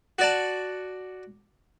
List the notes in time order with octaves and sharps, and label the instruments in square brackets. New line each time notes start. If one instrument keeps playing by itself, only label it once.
[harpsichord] F#4 D5 A5